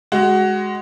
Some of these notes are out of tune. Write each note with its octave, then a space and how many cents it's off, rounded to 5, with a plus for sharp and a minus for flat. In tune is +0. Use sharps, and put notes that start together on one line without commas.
G#3 +0 F#4 +15